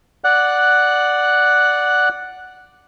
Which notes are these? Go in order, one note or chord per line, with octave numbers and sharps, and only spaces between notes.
D5 F#5 F#6